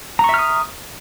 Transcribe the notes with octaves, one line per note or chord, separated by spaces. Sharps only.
E5 A#5 C#6 D#6 F6